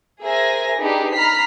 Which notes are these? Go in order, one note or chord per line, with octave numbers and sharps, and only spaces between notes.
G#4 A#4 C5 E5 G#5 A#6
D4 D#4 G4 G#4 B4
A#5 B5 F6 B6 C7